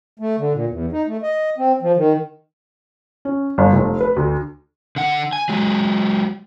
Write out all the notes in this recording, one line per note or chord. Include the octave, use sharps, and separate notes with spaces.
A3
D3
A#2
E2
D#4
A3
D#5
C4
F3
D#3
C#4
G1
F1
B4
D2
D3 F#5
G#5
F#3 G#3